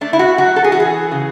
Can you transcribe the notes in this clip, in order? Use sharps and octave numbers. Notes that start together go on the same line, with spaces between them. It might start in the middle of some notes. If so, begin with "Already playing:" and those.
A3 D4
E4
F#4
F#3 F#4
A4
G#4
E3 F#4
G#4
C#3